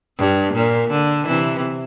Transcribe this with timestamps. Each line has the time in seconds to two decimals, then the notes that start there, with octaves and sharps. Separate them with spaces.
0.18 G2
0.53 A#2
0.90 D3
1.27 C3 E3